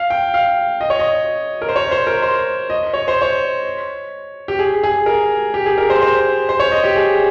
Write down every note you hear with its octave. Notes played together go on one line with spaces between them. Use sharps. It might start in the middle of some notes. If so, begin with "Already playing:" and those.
Already playing: F5
G5
F5
D#5
C#5
D#5
A#4
C5
C#5
C5
A#4
C5
D#5
C#5
C5
C#5
G4
G#4
G#4
A#4
G4
G#4
A#4
C5
C5
C5
C#5
D#5
G4
G#4